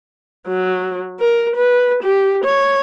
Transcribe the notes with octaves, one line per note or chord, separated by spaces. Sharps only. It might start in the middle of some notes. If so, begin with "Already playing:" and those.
F#3
A#4
B4
G4
C#5